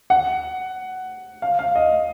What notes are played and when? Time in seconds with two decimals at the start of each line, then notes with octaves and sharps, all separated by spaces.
0.10 F#5
1.42 F5
1.59 F5
1.76 D#5